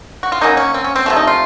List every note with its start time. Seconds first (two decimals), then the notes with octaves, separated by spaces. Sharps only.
0.23 F#4
0.32 F4
0.41 C#3 F#3 A#3 D#4
0.57 C#4
0.74 C4
0.84 C#4
0.95 C4
1.06 C3 F3 A3
1.16 D#4
1.27 F4